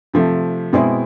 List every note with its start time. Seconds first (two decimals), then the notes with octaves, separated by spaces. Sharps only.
0.14 C3 F3 A3
0.73 B2 G#3 C4 E4